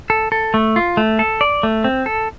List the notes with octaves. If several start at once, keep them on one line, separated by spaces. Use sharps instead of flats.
A4
A4
A3
F4
A3
A4
D5
A3
C4
A4